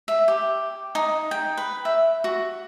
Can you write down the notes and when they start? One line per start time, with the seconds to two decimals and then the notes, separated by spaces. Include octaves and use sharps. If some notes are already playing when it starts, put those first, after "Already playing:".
0.08 E5
0.28 G4
0.95 D#4
1.31 G5
1.58 B4
1.85 E5
2.24 F#4